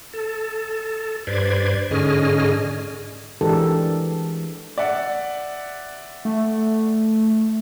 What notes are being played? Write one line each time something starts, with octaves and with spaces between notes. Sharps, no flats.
A4
G2 B4 C5 D5 G#6
G#2 D3 C#4 G#4 D#5 F6
E3 G#3 D4 G4 A4 A#4
D5 E5 F#5
A3